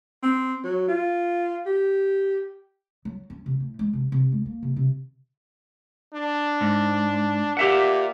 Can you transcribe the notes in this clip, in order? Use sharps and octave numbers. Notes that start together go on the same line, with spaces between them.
C4
F#3
F4
G4
F#3
C#4
C3
A2
G#3
C3
C3
G#3
A#3
C3
C3
D4
G#2
A#2 G4 E5 F#5